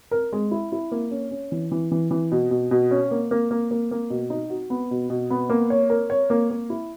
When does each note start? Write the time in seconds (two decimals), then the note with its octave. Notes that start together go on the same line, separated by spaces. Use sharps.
0.11 A#4
0.33 G#3
0.51 E4
0.72 E4
0.92 A#3
1.11 C#4
1.31 C#4
1.52 E3
1.72 E3
1.92 E3
2.11 E3
2.32 B2
2.51 B2
2.71 B2
2.91 C#4
3.11 A#3
3.31 A#3
3.51 A#3
3.71 A#3
3.91 A#3
4.10 B2
4.30 D#4
4.50 F#4
4.70 B3
4.91 B2
5.10 B2
5.30 B3
5.50 A#3
5.70 C#5
5.90 A#4
6.10 C#5
6.30 A#3
6.50 A#3
6.70 E4